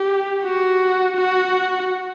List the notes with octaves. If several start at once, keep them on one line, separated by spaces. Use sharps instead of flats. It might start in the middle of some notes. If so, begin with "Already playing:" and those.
Already playing: G4
F#4
F#4